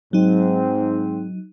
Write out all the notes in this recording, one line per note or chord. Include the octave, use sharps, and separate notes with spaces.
G#2 F#3 C4 D#4